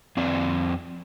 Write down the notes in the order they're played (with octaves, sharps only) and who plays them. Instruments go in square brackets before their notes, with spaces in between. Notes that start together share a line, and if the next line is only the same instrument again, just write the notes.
[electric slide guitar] F2 C4 D5